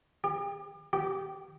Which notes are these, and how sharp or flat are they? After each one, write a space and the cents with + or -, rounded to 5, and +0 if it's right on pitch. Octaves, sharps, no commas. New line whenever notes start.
G4 +35
G4 -15